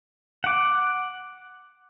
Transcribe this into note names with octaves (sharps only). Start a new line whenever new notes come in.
F#5 D6